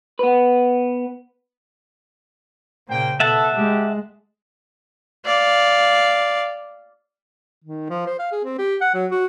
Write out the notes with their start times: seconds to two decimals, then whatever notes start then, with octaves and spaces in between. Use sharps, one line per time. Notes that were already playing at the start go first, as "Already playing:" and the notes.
0.19 B3 B4
2.89 A#2 C#3 A#3 C5 G5
3.20 B2 A4 E5 F#5 A5
3.54 G#3 G4
5.26 D5 F5
7.64 D#3
7.90 F3
8.07 C5
8.19 F5
8.32 G#4
8.44 C4
8.59 G4
8.81 F#5
8.94 F#3
9.11 F#4